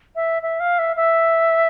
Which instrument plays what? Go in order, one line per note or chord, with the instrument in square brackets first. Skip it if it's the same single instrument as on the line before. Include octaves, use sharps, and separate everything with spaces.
[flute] E5
E5
F5
E5
E5